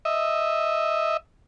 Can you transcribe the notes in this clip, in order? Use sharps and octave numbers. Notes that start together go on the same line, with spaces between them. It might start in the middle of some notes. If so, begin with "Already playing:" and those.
D#5 E5